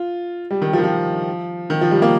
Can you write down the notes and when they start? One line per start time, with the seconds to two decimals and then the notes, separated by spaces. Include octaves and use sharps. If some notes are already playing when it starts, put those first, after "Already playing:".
Already playing: F4
0.51 G3
0.62 D#3
0.73 F3
0.78 D#3
0.83 F3
1.70 D#3
1.81 F3
1.91 G3
2.02 A#3